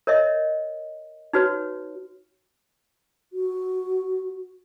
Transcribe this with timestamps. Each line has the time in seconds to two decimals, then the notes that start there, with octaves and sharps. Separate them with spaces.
0.07 A#4 C#5 D#5 E5
1.33 D#4 F#4 B4 C#5
3.33 F#4